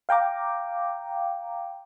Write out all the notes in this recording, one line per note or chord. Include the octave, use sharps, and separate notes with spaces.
F5 G5 A#5 D6